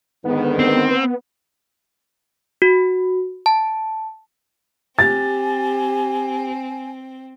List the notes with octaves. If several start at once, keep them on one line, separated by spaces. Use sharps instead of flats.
G#2 D3 D#3 B3
C4
F#4
A5
C4 G4 G#5 A6